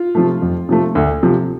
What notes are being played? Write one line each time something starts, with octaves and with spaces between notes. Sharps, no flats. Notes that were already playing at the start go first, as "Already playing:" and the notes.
Already playing: F4
C3 F3 A3
F2
C3 F3 A3
D2
C3 F3